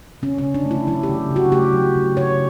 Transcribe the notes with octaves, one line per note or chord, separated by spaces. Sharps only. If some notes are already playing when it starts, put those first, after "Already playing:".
C#3 C#4
C#4
C#3
D4
A3
E4
F#3 E4
G4
C#3
C#3
F#4
A3 G4
F#3
C#3
C#3 C#5